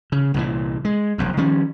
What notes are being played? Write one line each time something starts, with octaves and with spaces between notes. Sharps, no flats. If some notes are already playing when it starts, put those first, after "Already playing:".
C#3
C2 A#2 E3
G#3
F1 B1 E2
D#3 F3 G3 C#4